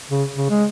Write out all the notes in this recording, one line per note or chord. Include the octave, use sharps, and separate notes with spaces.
C#3
C#3
G#3